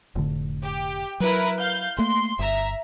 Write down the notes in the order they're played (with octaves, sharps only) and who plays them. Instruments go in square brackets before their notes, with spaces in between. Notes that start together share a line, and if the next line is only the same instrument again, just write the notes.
[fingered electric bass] F1 A2 D3
[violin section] G4
[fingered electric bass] F#3 [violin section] E4 A#4 B4
[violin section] F5 G6
[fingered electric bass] A3 A#3 [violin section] C6
[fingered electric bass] G1 [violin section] E5 A#5